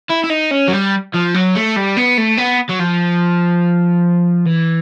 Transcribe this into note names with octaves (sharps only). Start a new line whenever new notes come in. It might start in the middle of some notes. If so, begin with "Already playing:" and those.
E4
E4
D#4
C#4
F#3
G3
F3
F#3
A3
G3
B3
A3
B3
F#3
F3
E3